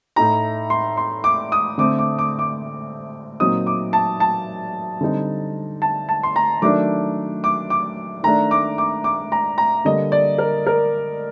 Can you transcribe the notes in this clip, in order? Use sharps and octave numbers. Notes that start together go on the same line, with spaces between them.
A2 A3 D#4 A#5
C6
C6
D6
D#6
D3 A3 C4 D6
D6
D6
D6
A#2 F#3 C4 D#4 D#6
D6
A5
A5
D3 G3 C4 D#4
A5
A5
C6
A#5
D#3 F#3 A3 D4 D6
D6
D6
D#3 A3 D4 A#5
D6
D6
D6
A#5
A#5
D3 G3 A#3 D#5
D5
A#4
A#4